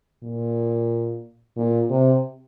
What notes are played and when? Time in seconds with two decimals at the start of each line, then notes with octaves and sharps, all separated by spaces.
0.23 A#2
1.57 A#2
1.90 C3